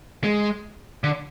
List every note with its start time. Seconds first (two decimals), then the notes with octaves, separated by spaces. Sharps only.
0.24 G#3
1.04 D3